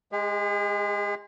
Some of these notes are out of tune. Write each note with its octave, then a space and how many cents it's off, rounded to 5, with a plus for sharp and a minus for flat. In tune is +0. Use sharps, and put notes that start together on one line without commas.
G#3 +0 G#4 -45